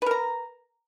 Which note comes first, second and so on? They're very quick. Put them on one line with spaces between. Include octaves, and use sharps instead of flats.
B4 A#4 A#5